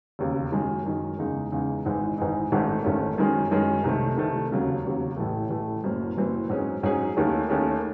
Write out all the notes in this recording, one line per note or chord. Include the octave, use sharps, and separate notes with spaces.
E1 D#2 C#3
F#2 D#3 G#3
F#2 D#3 G#3
E2 C#3 G#3 D#4 G#4
E2 C#3 G#3 D#4 G#4
G#1 G#2 E3 G#3 D#4
G#1 G#2 E3 G#3 D#4
G#1 G#2 D#3 A3 C#4
G#1 G#2 D#3 A3 C#4
F#2 D#3 G#3 C#4
F#2 D#3 G#3 C#4
C2 C3 D#3 A3
C2 C3 D#3 A3
E1 D#2 C#3 F#3
E1 D#2 C#3 F#3
A1 A2 E3 A3
A1 A2 E3 A3
F#1 F#2 E3 C4
F#1 F#2 E3 C4
G#2 F#3 C#4 G#4
G#2 F#3 C#4 G#4
D#2 D#3 A3 C#4 G#4
D#2 D#3 A3 C#4 G#4